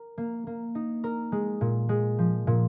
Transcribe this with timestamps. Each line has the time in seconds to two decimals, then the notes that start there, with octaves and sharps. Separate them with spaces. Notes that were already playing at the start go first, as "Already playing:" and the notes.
Already playing: A#4
0.18 A#3
0.47 A#3
0.75 D#4
1.04 A#4
1.32 G#3
1.61 A#2
1.89 G#3
2.19 F3
2.47 A#2